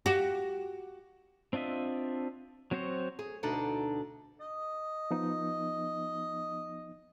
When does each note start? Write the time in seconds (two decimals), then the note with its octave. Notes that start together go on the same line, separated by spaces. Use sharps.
0.06 F#4 G4
1.53 C4 D4 F4 D#5 E5
2.71 F#3 C4 F#4 C5 C#5
3.19 G#4
3.43 D2 B2 D4 D#4 A4 D5
4.41 D#5
5.11 F3 B3 D#4